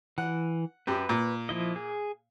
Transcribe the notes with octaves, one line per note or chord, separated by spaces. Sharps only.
E3 F#5
F#2 G4 B4
A#2
F3 E4 D#5
G#4